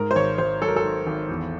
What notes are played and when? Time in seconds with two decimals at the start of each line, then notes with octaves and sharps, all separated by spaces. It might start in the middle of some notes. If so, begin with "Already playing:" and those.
Already playing: G#2 A#4
0.11 C5
0.16 G#1 C#5
0.38 G#1 C5
0.61 F#3 A4
0.68 A#4
0.76 A4
0.84 D#3
1.07 G#1
1.29 E2